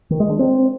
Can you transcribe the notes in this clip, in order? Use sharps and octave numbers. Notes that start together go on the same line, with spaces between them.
D#3
G#3
D4
C4